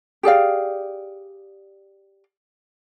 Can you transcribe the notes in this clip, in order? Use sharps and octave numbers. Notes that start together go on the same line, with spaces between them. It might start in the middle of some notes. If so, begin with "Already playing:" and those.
G4 G#4 D5 F5